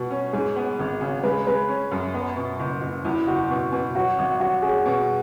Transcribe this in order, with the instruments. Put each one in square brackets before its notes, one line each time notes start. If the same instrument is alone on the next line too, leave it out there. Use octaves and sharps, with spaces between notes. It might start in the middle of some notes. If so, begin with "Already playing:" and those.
Already playing: [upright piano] B2 [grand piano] F#4
[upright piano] C#4
[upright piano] G#2 [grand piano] G#4
[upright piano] B3
G#1
C#3
[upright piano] G#3 [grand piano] B4
[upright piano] G#3 [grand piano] B4
[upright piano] C#4
F#2
[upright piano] B3 [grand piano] B4
[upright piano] B2
F#1
F#1
[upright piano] E2 [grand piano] E4
[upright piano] F#1 [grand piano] F#4
[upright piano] B2
B2
[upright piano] F#3 [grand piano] F#4
[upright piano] G#1
[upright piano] F#3 [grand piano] F#4
[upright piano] C#4 [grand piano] G#4
[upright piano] B2